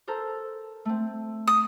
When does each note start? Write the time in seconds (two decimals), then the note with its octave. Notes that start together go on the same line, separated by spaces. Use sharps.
0.07 A4 A#4 C5
0.85 A3 C4
1.47 D#6